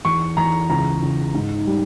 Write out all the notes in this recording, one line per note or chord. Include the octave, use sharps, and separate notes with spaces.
E2 C#6
E2 A#5
C#2 A#5
C#2
G#2
G3